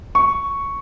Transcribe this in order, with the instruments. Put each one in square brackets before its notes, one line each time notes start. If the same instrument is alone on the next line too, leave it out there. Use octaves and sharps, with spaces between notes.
[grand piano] C#6